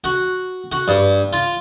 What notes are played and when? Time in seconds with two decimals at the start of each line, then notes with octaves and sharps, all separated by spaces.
0.04 F#4
0.72 F#4
0.88 G2
1.33 F4